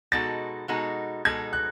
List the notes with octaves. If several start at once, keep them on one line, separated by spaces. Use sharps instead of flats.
B2 G#3 D#4 F#4 A4 A6
B2 G#3 D#4 F#4 A4
B2 G#3 D#4 F#4 A4 G#6
F#6